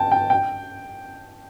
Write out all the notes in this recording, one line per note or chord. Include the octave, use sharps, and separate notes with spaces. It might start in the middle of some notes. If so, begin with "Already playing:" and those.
Already playing: G5 A5
G5
G5